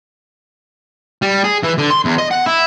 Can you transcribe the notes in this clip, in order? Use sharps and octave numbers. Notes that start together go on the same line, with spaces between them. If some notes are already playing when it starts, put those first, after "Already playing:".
G3
G#4
E3
D3
C6
E2
D#5
F#5
E4